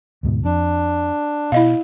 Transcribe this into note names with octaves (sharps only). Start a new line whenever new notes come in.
D2 G#2 B2
F2 D4
B2 E4 D#5 F5